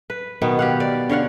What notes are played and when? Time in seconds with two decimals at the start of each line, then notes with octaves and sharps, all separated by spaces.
0.10 B4
0.42 B2 D#3 B3
0.59 G4 F5 F#5
0.80 D5
1.09 D3 C#5 F5 F#5